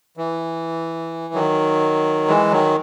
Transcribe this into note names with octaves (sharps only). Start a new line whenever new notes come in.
E3
D#3 F#3
E3 G#3
D#3 F#3